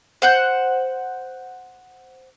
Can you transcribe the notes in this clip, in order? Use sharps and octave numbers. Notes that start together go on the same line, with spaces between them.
C5 F#5 G6